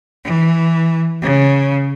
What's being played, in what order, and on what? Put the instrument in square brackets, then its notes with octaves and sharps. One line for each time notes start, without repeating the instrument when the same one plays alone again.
[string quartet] E3
C#3